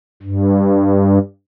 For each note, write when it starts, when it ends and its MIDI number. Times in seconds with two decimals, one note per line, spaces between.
0.23 1.19 43